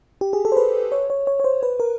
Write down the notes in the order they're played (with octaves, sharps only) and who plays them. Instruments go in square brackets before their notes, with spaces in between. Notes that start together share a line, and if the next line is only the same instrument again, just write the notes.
[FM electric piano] G4
G#4
A4
C5
B4
C#5
C#5
C#5
C#5
C5
B4
A#4